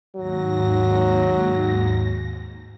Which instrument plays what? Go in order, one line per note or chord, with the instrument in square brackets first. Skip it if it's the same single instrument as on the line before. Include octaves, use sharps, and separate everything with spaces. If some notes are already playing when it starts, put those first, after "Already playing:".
[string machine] D#2 G#2 A#6 [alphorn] F#3